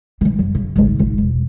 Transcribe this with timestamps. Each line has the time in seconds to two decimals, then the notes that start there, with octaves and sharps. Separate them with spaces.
0.21 D#3 B3
0.39 F#2
0.55 C#3
0.76 G#1 C#2
0.99 G#1 F4
1.18 E1